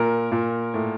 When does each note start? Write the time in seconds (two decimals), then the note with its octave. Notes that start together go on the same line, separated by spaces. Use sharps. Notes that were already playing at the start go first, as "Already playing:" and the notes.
Already playing: A#2 A#4
0.32 A#2
0.74 A2